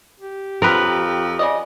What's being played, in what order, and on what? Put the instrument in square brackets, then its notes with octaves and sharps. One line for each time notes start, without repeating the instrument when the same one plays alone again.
[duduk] G4
[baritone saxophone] F2 [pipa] F3 F#3 [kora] A#4 B4
[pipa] C#3 D5 D#5